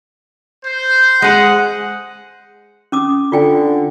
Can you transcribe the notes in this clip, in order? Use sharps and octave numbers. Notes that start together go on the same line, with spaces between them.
C5
G#3 G#4 F#5
C#4 D6 D#6
D3 F4 G5 G#5